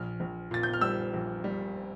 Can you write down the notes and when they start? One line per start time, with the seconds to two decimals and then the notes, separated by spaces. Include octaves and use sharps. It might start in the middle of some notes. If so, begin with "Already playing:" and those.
Already playing: A#1 F6
0.20 A#1
0.51 A#2 A6
0.63 G6
0.73 F6
0.81 G3 E6
1.14 A#1
1.44 G3